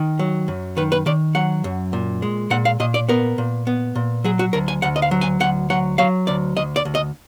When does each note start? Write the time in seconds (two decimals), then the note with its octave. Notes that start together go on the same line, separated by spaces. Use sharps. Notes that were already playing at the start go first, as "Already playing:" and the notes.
Already playing: D#3
0.19 F#3
0.48 F#2
0.77 D#3 B4
0.92 B4
1.06 D#3 D5
1.35 F#3 F#5
1.64 F#2
1.93 A#2
2.22 G#3
2.50 A#2 F#5
2.65 F5
2.80 A#2 D#5
2.94 D5
3.09 B3 A#4
3.38 A#2
3.67 B3
3.95 A#2
4.24 F#3 G#4
4.39 F#4
4.53 D2 A#4
4.68 G#5
4.82 D2 F#5
4.96 D#5
5.02 F5
5.11 F#3
5.21 G#5
5.40 D2 F#5
5.70 F#3 F#5
5.98 F#3 F5
6.27 D2 D5
6.57 D2 D#5
6.76 D5
6.85 D2
6.95 D#5